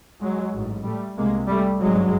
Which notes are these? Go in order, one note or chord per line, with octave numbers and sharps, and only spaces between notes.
F#3 G#3
A1 G#2
G3 A3
C2 C3 G#3 A#3
G3 A3
G#1 G2 F#3 G#3